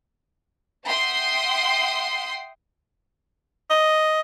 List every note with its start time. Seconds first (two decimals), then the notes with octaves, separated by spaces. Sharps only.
0.86 E5 F#5 G5 C6 D#6 C7
3.70 D#5